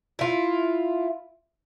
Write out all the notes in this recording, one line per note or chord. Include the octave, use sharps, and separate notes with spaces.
E4 F4